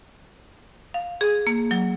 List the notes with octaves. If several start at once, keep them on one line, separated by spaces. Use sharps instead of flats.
F5
G#4
A#3
F#3